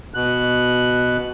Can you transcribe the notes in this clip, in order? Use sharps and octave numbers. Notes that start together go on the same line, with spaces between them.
B2 F#6